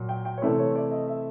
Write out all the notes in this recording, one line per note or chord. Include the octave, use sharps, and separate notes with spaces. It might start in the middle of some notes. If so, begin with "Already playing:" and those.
Already playing: A#2 F#3
G5
G5
C#5
C3 E3 A3 C4 E4 D5
C#5
D5
D#5
E5